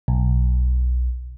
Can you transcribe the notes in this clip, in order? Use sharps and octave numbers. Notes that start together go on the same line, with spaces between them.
B1